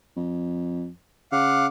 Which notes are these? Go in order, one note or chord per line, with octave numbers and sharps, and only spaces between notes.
F2
C#3 F5 F#5 D6